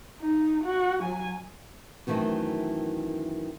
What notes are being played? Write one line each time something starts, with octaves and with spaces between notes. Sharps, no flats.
D#4
F#4
F#3 G#5
F#2 D#3 E3 A3 C4